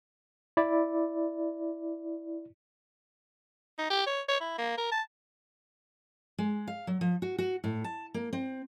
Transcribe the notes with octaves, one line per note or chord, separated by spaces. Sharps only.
E4 D5
D#4
G4
C#5
C#5
E4
A#3
A#4
A5
G#3
F5
F#3
F3
F#4
F#4
A2
A5
A#3
C4